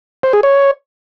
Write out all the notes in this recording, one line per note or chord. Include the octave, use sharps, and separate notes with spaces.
C5
G#4
C#5